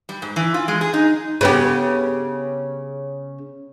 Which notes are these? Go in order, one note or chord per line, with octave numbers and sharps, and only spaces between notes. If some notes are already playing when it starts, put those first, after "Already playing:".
G3
G#2
E3
F4
G#3
G#4
D#4
C#3 B3 G4